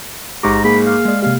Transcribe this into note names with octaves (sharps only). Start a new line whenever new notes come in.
A1 G#2 G4 A#5 C#6 D6
A#3 G#4 B5
F5
G#3 D5
C3 A#3 G4 F5